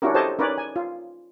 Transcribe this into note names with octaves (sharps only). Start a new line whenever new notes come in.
C#4 D4 E4 F#4 G4 A#4
G4 A4 C5 C#5 D#5 A5
C#4 D#4 A#4 B4 C#5 D5
G#5
F4